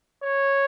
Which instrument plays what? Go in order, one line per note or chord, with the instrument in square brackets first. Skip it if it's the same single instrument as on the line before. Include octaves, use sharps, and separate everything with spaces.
[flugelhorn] C#5